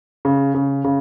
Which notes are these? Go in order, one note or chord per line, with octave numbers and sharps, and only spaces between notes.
C#3
C#3
C#3